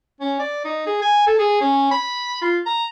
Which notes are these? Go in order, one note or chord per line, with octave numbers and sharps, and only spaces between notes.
C#4
D5
D#4
G#4
G#5
A4
G#4
C#4
B5
F4
A#5